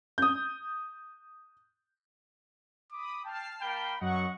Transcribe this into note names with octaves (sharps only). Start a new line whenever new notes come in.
D#6 G6
B5 D6 D#6
G5 A5 F6 C7
A#3 G5 B5
F#2 F#3 D#5 F#5 C#6